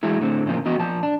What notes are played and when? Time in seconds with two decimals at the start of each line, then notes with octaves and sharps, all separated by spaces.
0.03 E3 F#3 G#3 E4
0.19 A2 D3 C4
0.46 A2 C#3 F3 A#3
0.65 E3 B3 F#4 D#5
0.79 A#2 F3 A5
1.03 D4